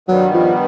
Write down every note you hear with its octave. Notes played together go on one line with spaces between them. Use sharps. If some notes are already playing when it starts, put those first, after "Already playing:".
G2 D#3 F#3 G3 B3
F3